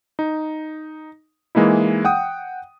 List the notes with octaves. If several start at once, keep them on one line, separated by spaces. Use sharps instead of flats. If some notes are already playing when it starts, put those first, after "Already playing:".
D#4
E3 G#3 A#3 D#4 E4
F#5 G5 D#6